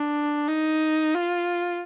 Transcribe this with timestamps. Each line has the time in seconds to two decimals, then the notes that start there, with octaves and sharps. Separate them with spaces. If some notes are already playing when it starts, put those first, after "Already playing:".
Already playing: D4
0.48 D#4
1.15 F4